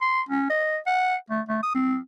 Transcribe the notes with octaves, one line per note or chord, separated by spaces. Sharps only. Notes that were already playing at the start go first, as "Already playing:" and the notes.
C6
C#4
D#5
F#5
A3
A3
D#6
C4